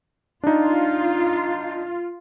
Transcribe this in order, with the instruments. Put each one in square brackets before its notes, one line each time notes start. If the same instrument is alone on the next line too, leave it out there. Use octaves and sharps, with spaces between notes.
[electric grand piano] D4 D#4 [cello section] F4